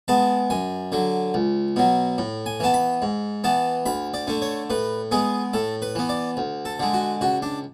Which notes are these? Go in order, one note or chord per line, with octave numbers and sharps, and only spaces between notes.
G#3 B3 A5
F#2 G#5
D3 F#3
C#2
B2 F#3
A2
G#5
E3 B3 A5
B5
G#2
E3 B3 A5
D2 B5
D5
D3 A3
C#5
A2 B4
G#3 B3 G#4
A2 A4
B4
E3 B3
D5
D2
A4
D3 G#3
F#4
C#2 F#4
D4